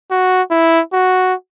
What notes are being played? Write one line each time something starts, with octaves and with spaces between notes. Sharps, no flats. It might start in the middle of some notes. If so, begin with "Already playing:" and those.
F#4
E4
F#4